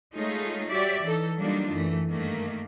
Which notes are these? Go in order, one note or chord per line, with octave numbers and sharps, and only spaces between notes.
G#3 A3 D#4 F4 G#4 C#5
G3 F#4 G4 C#5 D5 E5
E3 D#4 A4
F#3 G3 A#3 D4 D#4 F4
F#2 E3 A3
G2 D#3 A3 A#3